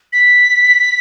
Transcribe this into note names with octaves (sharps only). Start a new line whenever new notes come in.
B6